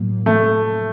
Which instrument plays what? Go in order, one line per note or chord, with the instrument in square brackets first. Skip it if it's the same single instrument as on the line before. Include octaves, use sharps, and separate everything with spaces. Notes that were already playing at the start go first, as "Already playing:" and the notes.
Already playing: [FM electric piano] A2 F#3 A#3
[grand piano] A3